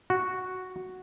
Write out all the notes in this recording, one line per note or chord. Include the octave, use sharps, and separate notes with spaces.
F#4